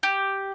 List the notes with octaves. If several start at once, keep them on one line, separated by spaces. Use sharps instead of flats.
G4